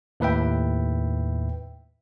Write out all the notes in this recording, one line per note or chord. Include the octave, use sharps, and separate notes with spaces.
D#2 A2 B4 E5 G5